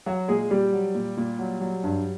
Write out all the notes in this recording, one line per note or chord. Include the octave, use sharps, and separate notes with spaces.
F#3 F#4
A#2 G#3 G#4
A#2 G3 G4
F#3
A#2
A#2
F#3
F#3
G2